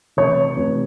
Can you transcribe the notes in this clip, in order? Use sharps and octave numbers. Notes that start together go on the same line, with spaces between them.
F1 C#5
F1